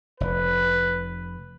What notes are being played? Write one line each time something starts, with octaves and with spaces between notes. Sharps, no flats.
F1 B4